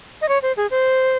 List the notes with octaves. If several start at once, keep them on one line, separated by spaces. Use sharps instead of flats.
D#5
C#5
C5
G#4
C5